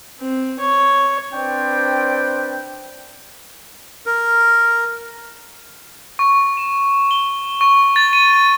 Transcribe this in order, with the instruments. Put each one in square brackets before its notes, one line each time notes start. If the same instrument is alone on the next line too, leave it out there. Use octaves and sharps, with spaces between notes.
[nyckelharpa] C4
C#5
[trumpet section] C4 D4 B4 C5 D5 G5
[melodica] A#4
[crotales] C#6
E7
G7
C#6
A6
D#7